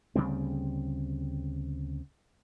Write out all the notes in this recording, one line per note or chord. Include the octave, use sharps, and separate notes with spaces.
D2 C#3 G3 C4